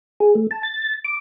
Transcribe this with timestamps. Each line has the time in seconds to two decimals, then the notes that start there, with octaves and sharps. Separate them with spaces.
0.20 G#4
0.35 A3
0.51 A5
0.63 A6
1.05 D6